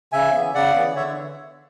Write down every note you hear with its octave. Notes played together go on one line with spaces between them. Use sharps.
C#3 E5 G#5
E3 B3
C#3 D5 F#5
E3 B3
D3 C#5 E5